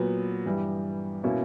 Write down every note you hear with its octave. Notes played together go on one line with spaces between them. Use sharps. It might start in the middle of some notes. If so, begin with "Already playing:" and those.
Already playing: A#2 F#3 B3
G2 E3 G3
B2 A#3 C#4 E4